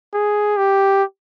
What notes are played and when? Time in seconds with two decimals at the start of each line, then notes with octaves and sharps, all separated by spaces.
0.14 G#4
0.57 G4